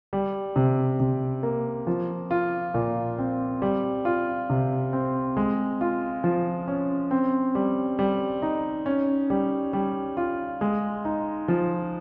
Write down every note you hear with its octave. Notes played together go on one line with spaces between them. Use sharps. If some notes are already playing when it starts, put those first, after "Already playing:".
G3
C3
C3
A#3
F3
F4
A#2
C4
G3
F4
C3
C4
G#3
F4
F3
C#4
C4
G3
G3
D#4
C#4
G3
G3
F4
G#3
D#4
F3